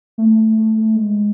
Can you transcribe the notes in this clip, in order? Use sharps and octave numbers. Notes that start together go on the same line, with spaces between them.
A3
A3
A3
A3
G#3